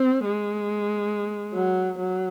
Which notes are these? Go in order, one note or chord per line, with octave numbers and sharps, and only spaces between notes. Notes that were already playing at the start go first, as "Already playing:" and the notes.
Already playing: C4
G#3
F#3
F#3